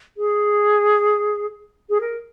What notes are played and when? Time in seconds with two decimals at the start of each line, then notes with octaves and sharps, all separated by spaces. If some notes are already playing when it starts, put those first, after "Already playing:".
0.17 G#4
1.89 G#4
2.01 A#4